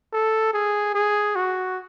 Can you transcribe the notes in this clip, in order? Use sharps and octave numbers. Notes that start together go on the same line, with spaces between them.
A4
G#4
G#4
F#4